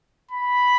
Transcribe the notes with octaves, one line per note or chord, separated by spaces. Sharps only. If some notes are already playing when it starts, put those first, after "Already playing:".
B5